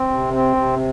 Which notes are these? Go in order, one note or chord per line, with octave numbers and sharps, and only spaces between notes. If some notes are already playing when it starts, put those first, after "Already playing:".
Already playing: C4
C3
C4
C3